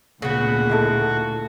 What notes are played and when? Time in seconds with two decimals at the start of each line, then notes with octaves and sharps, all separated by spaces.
0.22 D2 A#2 C#3 B3 F#4
0.70 D#4 E4 A4